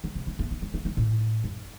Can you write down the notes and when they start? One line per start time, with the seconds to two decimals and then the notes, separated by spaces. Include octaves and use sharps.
0.04 D3
0.15 C3
0.27 G3
0.39 A3
0.51 A3
0.62 G3
0.74 A3
0.85 G3
0.97 A2
1.44 F#2